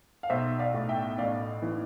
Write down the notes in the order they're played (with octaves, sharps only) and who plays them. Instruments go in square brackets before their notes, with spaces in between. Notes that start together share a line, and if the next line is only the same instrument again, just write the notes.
[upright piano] F5
B1 C5 E5
D5 F5
A2
E5 G5
A1 D5 F5
E3